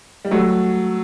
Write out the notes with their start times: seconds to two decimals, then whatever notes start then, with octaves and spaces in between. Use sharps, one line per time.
0.25 G3
0.31 F#3 A3